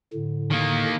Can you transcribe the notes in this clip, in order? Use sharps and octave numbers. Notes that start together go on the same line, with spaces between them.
A2 D3
D#3 A#3